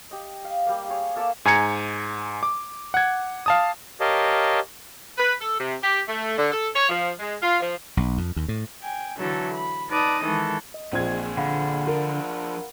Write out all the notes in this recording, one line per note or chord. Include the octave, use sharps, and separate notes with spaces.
G4 D#5
F5
G3 A#3
G#4 C#5 G#5
A#3 A4 E5 D6
G#2 G#5 A#5 G#6 C#7
D6
F#5 G#6
F5 A5 D#6
G4 A#4 C#5 D#5 F5 A5
B4
A4
C3
G4
A3
D3
A4
C#5
F3
G#3
F4
F3
B1
F2
D#2
A2
G5 G#5
D3 E3 F#3 A3 A4
B5
D#4 B4 D5 A5 D#6
D#3 E3 G#3 A4
D#5
A#1 A#2 C4 G#4 G#6
D3 F5 F#5 B5
F3 D4 A#4